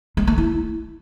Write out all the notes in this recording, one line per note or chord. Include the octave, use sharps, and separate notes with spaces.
G#3
A3
E4